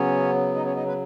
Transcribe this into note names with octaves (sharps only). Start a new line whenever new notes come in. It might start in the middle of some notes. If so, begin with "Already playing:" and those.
Already playing: C#3 F#3 B3 C#4 C#5
D#4 D#5
C#4 C#5
D#4 D#5
B3 B4